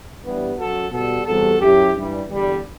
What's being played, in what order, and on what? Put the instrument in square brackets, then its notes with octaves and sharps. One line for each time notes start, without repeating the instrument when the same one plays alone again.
[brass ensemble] G2 E3 G3 B3
F#2 F#3 F#4 A4
B2 G3 F#4 A4
E2 C3 G3 F#4 A4
F#2 F#3 E4 G4
G2 E3 G3
E2 D3 G3